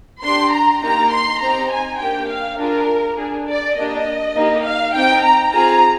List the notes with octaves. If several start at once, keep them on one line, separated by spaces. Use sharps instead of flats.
D4 G4 C6
A#5
A#3 D#4 G4 A#5
C6
C4 D#4 G4 A#5
G#5
A#3 D4 G4 G5
F5
D4 F4 G#4 A#4
D4 G#4
D5
A#3 D4 G4 D#5
A#3 D#4 G4
F5
C4 D#4 G4 G5
A#5
C4 F4 G#4 A#5